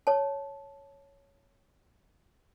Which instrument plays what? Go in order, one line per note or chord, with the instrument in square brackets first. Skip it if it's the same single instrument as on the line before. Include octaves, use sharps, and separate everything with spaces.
[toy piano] C#5 A5